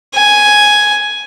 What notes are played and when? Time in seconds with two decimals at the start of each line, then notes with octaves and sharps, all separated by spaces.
0.14 G#5